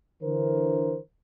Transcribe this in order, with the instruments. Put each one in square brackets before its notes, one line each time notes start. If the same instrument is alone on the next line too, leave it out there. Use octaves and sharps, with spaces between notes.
[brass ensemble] D3 E3 A#4 C5